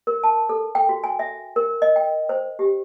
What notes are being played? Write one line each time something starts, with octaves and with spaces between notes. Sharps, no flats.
A#4
A5
A4
G5
F#4
G#5
E5
A#4
D#5
G5
C5
G4